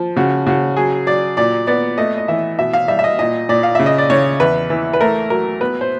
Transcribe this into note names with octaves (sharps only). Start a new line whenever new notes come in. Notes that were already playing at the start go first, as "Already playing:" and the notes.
Already playing: F3
C#3 F#4
C#3 F#4
F#3 G#4
F#3 D5
A#2 D5
B3 D5
A3 D#5
D#5
E3 E5
B2 E5
F5
G3 E5
E5
D#5
A#2 D#5
A#2 D5
F5
C#3 E5
D#5
D5
C#3 C#5
E2 B4
E3
B4
A3 A#4
F#3 A#4
B3 B4
C5